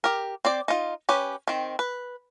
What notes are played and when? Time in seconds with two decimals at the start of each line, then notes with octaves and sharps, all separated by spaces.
0.04 G4 A#4
0.45 C4 C5 D5
0.68 D#4 F4
1.09 C#4 G4 B4
1.48 D#3 C4
1.79 B4